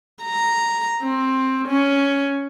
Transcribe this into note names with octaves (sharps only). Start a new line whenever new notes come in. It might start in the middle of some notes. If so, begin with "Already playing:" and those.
A#5
C4
C#4